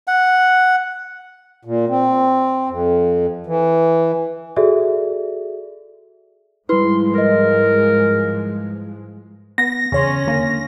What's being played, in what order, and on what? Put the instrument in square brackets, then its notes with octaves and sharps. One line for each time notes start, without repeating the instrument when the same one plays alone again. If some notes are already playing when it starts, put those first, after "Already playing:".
[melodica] F#5
[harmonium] A#2
C4
F2
E3
[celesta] F#4 G#4 A4 D5 E5
[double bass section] G#2 F3 G#3 [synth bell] G3 E4 [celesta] B4 [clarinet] C6
[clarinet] A#4 [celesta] B4 D#5
[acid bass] B3 [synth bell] A#6
[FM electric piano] E2 C#5 C6 [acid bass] C#3 [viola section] C#4
[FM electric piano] D3 [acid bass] A#3